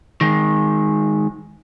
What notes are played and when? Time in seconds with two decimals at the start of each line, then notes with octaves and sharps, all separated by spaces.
0.21 D#3 G#3